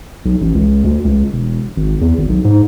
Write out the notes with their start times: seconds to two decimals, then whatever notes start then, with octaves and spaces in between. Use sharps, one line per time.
0.25 B1
0.41 A1
0.55 C#2
0.84 D2
1.05 C#2
1.33 E1
1.76 G#1
2.01 E2
2.18 G#1
2.29 B1
2.45 G#2